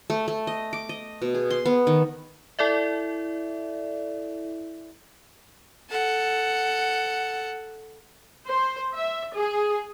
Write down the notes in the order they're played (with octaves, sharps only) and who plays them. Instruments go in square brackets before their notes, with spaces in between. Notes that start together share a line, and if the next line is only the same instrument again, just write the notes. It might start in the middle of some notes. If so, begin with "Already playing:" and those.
[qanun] A3
A3
D#5
D6
D#5
B2
G#4
C6
B3
D#3
[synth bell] E4 A4 D5 E5
[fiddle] A4 F#5
[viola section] C5
E5
G#4